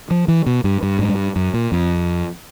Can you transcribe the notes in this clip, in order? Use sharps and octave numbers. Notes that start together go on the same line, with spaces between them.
F3
E3
B2
G2
G2
G#2
G2
F#2
A#2
F2